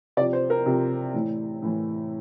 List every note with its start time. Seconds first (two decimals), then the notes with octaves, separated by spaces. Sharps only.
0.17 C3 D5
0.20 F3
0.33 C5
0.50 A#4
0.66 C3 F3
1.14 A2 E3
1.62 A2 E3